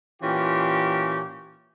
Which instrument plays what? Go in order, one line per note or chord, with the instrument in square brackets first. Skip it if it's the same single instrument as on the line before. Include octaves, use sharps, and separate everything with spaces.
[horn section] A#2 E3 C#4 F4 G4